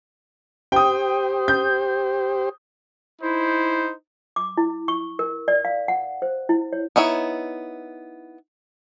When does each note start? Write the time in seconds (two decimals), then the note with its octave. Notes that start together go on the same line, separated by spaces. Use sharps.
0.72 G4 C5 G5 D#6
1.48 G6
3.21 D#4 E4 C5
4.36 D6
4.57 E4
4.88 C#6
5.19 A#4
5.48 D5
5.65 F5
5.88 F#5
6.22 C5
6.49 E4
6.73 C#5
6.96 B3 D#4 E4 C#5